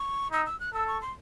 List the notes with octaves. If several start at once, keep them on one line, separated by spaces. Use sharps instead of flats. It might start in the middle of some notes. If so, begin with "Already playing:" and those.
Already playing: C#6
D#4 E6
E6
F#6
A4 E6
C#6
C6